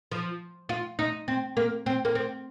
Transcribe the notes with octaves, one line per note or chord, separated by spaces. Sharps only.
F3
F4
D#4
C4
A#3
C4
A#3
C4